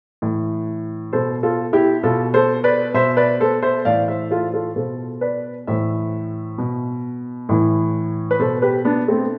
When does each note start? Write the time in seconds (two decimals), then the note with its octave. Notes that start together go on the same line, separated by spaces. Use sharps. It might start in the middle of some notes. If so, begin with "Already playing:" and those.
0.22 A2 E3
1.13 B2 A4 C5
1.43 F4 A4
1.73 E4 G4
2.03 B2 F4 A4
2.34 A4 C5
2.64 B4 D5
2.94 B2 C5 E5
3.17 B4 D5
3.40 A4 C5
3.62 C5 E5
3.85 A2 E3 D5 F5
4.08 C5 E5
4.31 F4 A4
4.54 F4 A4
4.76 B2 A4 C5
5.21 B4 D5
5.67 A2 E3 C5 E5
6.58 B2
7.49 A2 E3
8.31 B4
8.39 B2 A4 C5
8.62 G4 B4
8.85 B3 D4
9.08 A3 C4